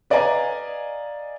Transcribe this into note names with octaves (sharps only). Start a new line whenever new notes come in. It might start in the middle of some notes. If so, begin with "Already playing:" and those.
B4 D5 D#5 F5 G#5 A#5